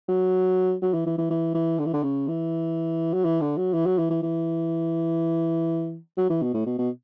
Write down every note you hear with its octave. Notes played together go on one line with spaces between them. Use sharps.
F#3
F#3
E3
E3
E3
E3
E3
D3
E3
D3
C#3
E3
F#3
E3
D3
F#3
E3
F#3
E3
E3
E3
F#3
E3
B2
A2
B2
B2